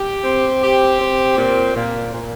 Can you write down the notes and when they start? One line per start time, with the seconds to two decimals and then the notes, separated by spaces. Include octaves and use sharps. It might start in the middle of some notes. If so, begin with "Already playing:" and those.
Already playing: G4
0.24 C4
0.61 G4
0.99 C4
1.37 A#2
1.75 A#2
2.12 A#2